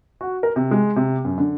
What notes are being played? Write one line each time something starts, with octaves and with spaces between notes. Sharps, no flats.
F#4
A#4
C3
G#3
C3
F#2
D3